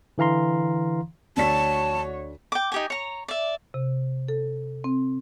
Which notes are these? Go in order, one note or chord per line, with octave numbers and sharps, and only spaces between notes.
D3 E3 F5 A#5 C6
D2 F#4 C#5 D5 A5 B6
G5 D6
D#4 G4 G#5
C#5 A#5
D5 E5
C3
A4
C4